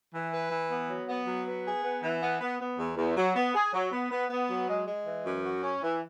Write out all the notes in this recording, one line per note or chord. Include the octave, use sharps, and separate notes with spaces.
E3
B4
E3
B3
F#3
B3
F#3
B3
G#4
B3
E3
B3
B3
B3
E2
E2
F#3
B3
G#4
F#3
B3
B3
B3
F#3
G#3
G#3
E3
F#2
F#4
C#4
E3